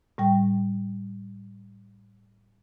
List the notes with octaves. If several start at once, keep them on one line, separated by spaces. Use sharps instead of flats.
A2 G3 G5